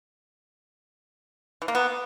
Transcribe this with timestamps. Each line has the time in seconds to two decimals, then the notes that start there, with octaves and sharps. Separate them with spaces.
1.62 E3
1.68 A#3
1.75 B3